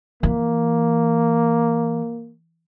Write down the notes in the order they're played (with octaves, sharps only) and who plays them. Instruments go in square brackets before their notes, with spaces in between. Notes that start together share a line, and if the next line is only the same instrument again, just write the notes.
[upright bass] E3 [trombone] A#3